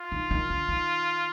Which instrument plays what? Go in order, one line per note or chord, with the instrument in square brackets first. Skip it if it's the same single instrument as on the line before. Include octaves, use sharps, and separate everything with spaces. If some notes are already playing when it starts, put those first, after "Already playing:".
Already playing: [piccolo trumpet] F4
[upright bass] D#3
D#3
D3
D#3